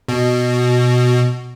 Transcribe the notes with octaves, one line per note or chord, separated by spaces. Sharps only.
B2